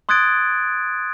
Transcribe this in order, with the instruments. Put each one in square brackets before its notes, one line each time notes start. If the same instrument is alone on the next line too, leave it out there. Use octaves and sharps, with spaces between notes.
[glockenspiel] C6 D#6 F#6 G#6 A6 D7